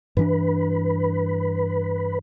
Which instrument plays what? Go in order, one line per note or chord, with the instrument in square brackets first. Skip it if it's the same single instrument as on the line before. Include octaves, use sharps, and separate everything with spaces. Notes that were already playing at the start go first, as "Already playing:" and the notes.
[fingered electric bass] G2 E3 D4 [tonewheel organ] B4